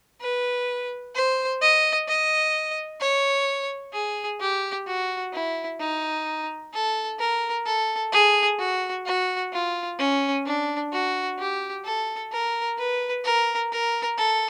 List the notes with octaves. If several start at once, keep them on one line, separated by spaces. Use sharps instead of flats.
B4
C5
D#5
D#5
C#5
G#4
G4
F#4
E4
D#4
A4
A#4
A4
G#4
F#4
F#4
F4
C#4
D4
F#4
G4
A4
A#4
B4
A#4
A#4
A4